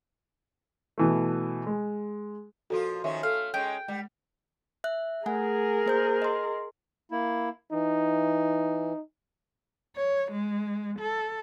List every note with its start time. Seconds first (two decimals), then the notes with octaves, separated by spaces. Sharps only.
0.98 B2 E3 A3
1.67 G#3
2.70 A#2 F3 F4 F#4 A4
3.04 D#3 F3 C#4 E5
3.23 A3 A4 F5
3.54 G#3 C#4 G5
3.88 G3 G#3
4.84 E5 F#6
5.26 A3 G#4 A#4 F#5 G#5
5.86 A#3 C5 G6
6.22 D#5 C6
7.11 A#3 E4
7.72 E3 D#4
9.96 C#5
10.32 G#3
10.99 A4